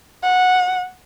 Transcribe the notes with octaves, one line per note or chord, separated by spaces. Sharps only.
F#5